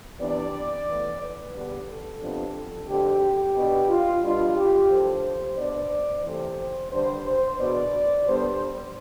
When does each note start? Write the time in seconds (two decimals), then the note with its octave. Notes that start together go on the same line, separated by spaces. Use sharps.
0.19 C3 E3 B3 D4 D5
0.87 A2 E3 B3
1.20 B4
1.54 E2 D3 G3 B3 D4
1.88 A4
2.21 F2 C3 F3 B3 D4
2.88 F2 D3 A3 C4 G4
3.23 G4
3.56 B2 B3 D4
3.89 F4
4.23 B2 G3 D4 F4
4.56 G4
4.90 A2 F3 A3 D4 C5
5.57 B2 B3 D4 D5
6.24 C3 E3 A3 C4 C5
6.91 G2 D3 G3 C5
7.25 C5
7.59 E2 B2 B3 D4 D5
8.26 D3 G3 B3 D4 C5